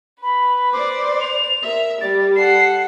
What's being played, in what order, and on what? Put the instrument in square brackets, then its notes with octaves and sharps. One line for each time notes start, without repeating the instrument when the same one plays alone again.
[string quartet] B4 [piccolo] B5
[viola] C5 D5 [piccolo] D6
[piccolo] F7
[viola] A#4 E5
[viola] G3 G4 [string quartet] D5 [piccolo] A6
[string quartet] A4 F#5 [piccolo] C7